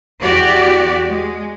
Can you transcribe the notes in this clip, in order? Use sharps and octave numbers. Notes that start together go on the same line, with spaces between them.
E2 F#4 G4 D5
G#3